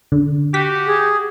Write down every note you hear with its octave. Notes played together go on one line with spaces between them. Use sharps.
D3
F#4 G4 B6
G#4